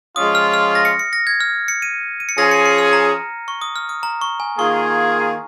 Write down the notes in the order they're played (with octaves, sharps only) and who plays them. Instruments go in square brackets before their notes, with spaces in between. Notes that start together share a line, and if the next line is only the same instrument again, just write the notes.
[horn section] F3 G#3 C#4 F4 [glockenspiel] D#6
[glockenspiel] F6
F6
A#6
C#7
C#7
A#6
G#6
F6
C#7
D#7
D#7
C#7
[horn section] F3 C#4 F4 G#4 [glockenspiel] A#6
[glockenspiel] C#7
C#7
F6
A#5
C#6
D#6
F6
D#6
A#5
C#6
G#5
[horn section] D#3 A#3 F4 G#4 [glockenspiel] C#6